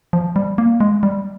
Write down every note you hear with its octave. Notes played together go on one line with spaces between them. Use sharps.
F3
G3
A#3
G#3
G3